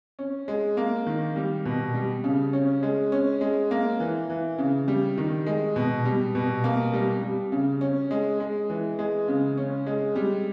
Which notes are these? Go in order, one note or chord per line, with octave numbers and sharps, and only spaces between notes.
C#4
G#3
A#3
D#3
G3
B2
G3
C#3
C#4
G#3
C#4
G#3
A#3
E3
E3
C#3
G3
D#3
G#3
B2
G3
B2
A#3
G3
G3
C#3
C#4
G#3
G#3
E3
G#3
C#3
C#4
G#3
G3